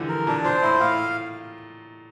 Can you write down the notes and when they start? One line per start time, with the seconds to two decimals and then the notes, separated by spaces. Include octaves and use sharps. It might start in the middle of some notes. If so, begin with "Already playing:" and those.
Already playing: D3 E3 F3 G3
0.09 A#4
0.27 A#2 D4
0.44 A#2 C5
0.62 A2 E4
0.80 A2 F5